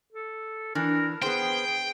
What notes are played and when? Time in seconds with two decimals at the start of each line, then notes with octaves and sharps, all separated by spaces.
0.13 A4
0.75 E3 D4 A#4
1.22 B3 G#4 C5 G5